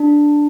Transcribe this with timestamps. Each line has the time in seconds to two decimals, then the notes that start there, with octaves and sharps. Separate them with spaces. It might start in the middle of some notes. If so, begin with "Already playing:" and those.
Already playing: D4